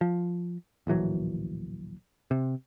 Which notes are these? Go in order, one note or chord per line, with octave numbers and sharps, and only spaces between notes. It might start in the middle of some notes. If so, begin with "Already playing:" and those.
F3
D1 A#1 E3 F#3
C3